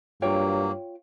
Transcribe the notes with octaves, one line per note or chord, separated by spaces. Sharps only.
G2 F#3 A#3 F4 C#5 G5